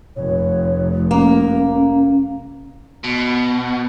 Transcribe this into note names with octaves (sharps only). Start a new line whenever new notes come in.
F1 C#5
A#3 C#4
B2